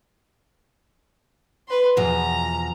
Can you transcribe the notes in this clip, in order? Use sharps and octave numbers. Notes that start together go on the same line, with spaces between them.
B4 C6
E2 B2 F3 A#5